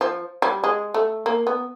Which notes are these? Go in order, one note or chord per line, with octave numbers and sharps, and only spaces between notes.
F3
G3
G#3
A3
A#3
B3